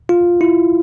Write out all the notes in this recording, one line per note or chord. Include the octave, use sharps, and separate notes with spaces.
F4
E4